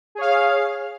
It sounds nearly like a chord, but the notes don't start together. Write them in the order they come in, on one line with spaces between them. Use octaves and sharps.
G#4 C#5 F5